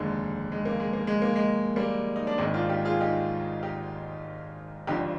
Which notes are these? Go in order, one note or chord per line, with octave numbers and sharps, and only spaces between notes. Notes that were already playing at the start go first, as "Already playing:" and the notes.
Already playing: F1 D#2 D3 G#3
G#3
A#3
G#3
A#3
G#3
A#3
G#3
G3 A#3
D#4
D4
G#1 G#2 D#3 G#3 C4
D4 F4
D#4 G4
F4 G#4
D#4 G4
D#4 G4
G#1 G2 D3 F3 D#4 G4